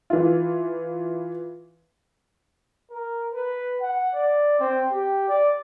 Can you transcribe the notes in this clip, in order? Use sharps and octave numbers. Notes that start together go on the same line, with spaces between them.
E3 F4
A#4
B4
F#5
D5
C4
G4
D5